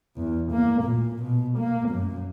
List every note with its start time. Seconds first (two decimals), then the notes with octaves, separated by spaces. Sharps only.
0.16 E2
0.52 A#3
0.83 A#2
1.23 B2
1.58 A#3
1.89 F#2